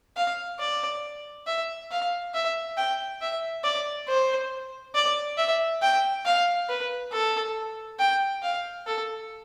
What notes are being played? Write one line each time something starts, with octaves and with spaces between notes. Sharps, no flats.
F5
D5
E5
F5
E5
G5
E5
D5
C5
D5
E5
G5
F5
B4
A4
G5
F5
A4